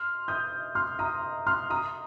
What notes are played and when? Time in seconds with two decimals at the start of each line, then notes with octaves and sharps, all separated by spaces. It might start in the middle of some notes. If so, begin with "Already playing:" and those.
Already playing: C6 F6
0.28 D#6 G6
0.75 C6 F6
0.99 A#5 D#6
1.47 C6 F6
1.70 A#5 D#6